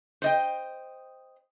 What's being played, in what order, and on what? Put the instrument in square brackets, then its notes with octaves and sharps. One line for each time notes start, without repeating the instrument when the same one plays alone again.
[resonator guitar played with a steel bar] C5 D#5 G5